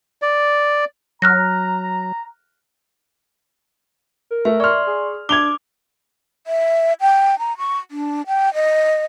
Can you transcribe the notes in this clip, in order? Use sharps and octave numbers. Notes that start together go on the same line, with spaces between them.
D5
F#3 A#5 F6 F#6 A#6
A#4
A3 E5
D5 C6 C#6 F6
G#4
D4 D6 G#6 F7 G7
E5
G5
A#5
C#6
D4
G5
D#5